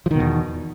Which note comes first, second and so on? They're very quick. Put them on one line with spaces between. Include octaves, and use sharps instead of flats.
F3 D#3 B2 E2